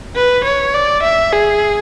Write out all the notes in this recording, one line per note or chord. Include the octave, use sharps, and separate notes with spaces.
B4
C#5
D5
E5
G#4